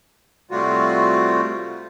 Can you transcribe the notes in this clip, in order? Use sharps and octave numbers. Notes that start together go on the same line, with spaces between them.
A2 C3 G3 F4 F#4